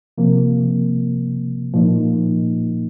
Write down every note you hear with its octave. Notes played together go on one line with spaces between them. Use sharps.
C3 F3 A#3
A#2 F3 A#3 D#4